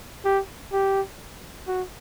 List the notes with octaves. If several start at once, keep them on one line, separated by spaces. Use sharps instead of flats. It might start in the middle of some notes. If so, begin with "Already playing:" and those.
G4
G4
F#4